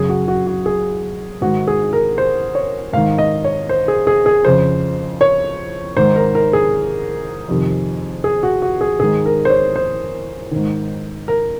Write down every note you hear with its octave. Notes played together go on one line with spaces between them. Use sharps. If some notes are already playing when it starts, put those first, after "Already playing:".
Already playing: F#2 C#3 G#4
F#4
F#4
F#4
G#4
G#2 D#3 F#4
G#4
A#4
C5
C#5
G#2 D#3 F5
D#5
C#5
C5
G#4
G#4
G#4
F2 C#3 C5
C#5
G#2 D#3 C5
A#4
A#4
G#4
F2 C3 D#3
G#4
F#4
F#4
G#4
G#2 D#3 G#4
A#4
C5
C#5
C5
G#2 D#3
A#4